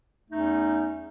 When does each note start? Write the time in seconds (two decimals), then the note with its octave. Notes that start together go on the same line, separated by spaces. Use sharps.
0.30 E2 A3 C#4 D#4